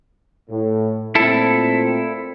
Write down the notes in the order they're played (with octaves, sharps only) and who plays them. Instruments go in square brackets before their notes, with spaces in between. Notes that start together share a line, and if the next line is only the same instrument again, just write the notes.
[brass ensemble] A2
[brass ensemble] A#2 A3 C4 [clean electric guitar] E4 A4